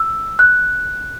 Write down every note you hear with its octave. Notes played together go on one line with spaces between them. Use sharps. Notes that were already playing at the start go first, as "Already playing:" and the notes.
Already playing: E6
F#6